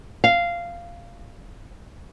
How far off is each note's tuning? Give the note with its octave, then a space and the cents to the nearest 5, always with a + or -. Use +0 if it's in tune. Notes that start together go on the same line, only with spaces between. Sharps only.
F5 -10